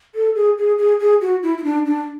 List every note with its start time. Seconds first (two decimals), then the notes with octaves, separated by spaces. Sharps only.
0.15 A4
0.35 G#4
0.58 G#4
0.78 G#4
1.00 G#4
1.21 F#4
1.43 E4
1.58 E4
1.64 D4
1.86 D4